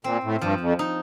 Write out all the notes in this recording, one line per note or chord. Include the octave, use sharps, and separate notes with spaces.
A#2 C4
A2
G2 F3
F2
D#4